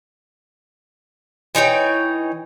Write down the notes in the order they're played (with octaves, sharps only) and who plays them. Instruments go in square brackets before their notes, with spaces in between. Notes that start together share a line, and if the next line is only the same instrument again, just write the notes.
[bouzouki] E3 D#4 C#5 G5